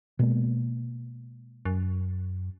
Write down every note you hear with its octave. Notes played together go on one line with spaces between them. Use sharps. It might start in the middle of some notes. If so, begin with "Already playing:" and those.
B2 G#3 A#3
F#2